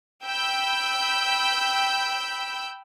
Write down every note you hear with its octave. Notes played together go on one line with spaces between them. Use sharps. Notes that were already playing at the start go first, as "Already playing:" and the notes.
G5 B5 E6 G6